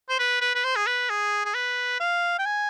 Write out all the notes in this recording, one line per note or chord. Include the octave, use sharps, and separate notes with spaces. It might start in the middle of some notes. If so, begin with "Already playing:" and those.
C5
B4
B4
B4
C5
G#4
B4
G#4
G#4
B4
F5
G5
G#5